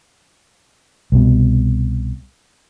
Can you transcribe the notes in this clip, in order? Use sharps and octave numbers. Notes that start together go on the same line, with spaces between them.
C2 B2